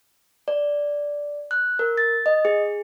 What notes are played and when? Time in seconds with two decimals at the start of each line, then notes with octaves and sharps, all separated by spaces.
0.48 D5
1.51 F#6
1.79 A#4
1.98 A6
2.26 D#5
2.45 G#4